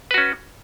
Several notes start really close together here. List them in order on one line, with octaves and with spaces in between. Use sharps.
B4 F#4 C#4